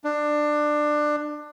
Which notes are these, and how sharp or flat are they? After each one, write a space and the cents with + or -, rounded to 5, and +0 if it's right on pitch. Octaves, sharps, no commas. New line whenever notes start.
D4 +20